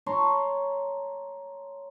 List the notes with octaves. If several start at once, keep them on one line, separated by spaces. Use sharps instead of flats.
C#5 A5 A#5 C6